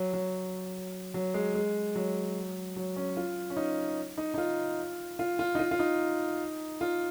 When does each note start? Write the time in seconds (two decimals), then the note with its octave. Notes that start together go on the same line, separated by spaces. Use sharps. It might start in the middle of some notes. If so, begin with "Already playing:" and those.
Already playing: F#3
0.13 F#3
1.14 F#3
1.34 G#3
1.55 G#3
1.95 F#3
2.76 F#3
2.96 C#4
3.17 F4
3.50 C#4
3.57 D#4
4.18 D#4
4.34 D#4
4.38 F4
5.19 F4
5.39 F4
5.55 D#4
5.59 F4
5.71 F4
5.79 D#4
6.81 F4